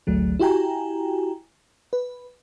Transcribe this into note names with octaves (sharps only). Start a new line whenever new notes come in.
G#1 D2 F#3 A3
E4 F#4 G4 G5 G#5 A#5
B4